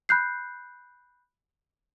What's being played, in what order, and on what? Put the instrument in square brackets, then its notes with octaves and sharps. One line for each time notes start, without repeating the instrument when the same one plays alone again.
[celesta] B5 F#6 G6 C7